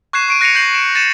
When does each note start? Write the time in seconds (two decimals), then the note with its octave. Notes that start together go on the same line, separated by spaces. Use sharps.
0.13 C#6 F#6 G#6 C7 E7
0.28 C#6 D7 D#7
0.41 F#6 A#6 C7 C#7 D#7 F7
0.55 G6 A#6 C7 F#7
0.73 D7 E7
0.95 A6 C#7 D#7 E7